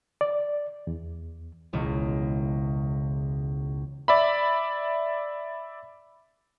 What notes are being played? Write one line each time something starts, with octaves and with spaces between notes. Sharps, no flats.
D5
E2
E1 C#2
D5 E5 B5